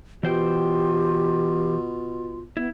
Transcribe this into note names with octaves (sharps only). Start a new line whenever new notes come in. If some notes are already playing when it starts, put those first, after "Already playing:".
B2 E3 F4 G4 C5 G5
B3 E4